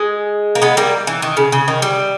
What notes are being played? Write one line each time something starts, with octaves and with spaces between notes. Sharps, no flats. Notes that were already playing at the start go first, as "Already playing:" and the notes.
Already playing: G#3
A#3
G#3 B3
G3 A#3
E3
D#3
C#3
C#3
D#3
G3